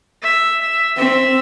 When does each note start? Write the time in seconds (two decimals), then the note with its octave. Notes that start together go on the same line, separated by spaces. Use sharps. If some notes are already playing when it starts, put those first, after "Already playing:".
0.22 E5
0.60 E5
0.97 C4 E5